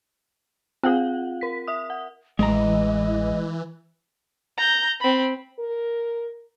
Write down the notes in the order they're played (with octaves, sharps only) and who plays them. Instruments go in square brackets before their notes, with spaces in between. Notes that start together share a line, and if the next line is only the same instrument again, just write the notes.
[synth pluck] C4 G#4 [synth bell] F4 F5 F#5
[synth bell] A#4 B6
E5 D#6
F#5
[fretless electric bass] A1 [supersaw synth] E3 [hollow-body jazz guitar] G#3 A#5 [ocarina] D#5
[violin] A#5 G6
C4 B5
[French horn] A#4